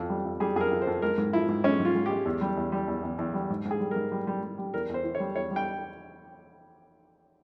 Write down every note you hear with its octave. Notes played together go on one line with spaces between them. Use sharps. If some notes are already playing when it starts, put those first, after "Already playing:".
Already playing: F2 E3
G3
F2
G3 G#4
F2 G#4 A#4
F2
C5
F2
G#3 A#4
G#2
F3 E4
G#2
G#3 C#4
G#2
F4
G#2
G#3 G4
E2
G3
E2
G3
E2
E2
E2
G3
G#2
G#2
G#4
G3
G#2 A#4
G3
G3
G3
G3
E2 A#4
E2 C5
E3
C#5
G3
E2 C#5
G3
G5